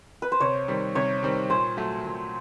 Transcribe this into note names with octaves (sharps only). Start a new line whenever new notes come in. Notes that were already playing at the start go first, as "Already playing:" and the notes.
B4
C5
C3 C#5
D#3 G3 C4
C3 C#5
D#3 G3 C4
A#2 C5
F#3 A3
A#2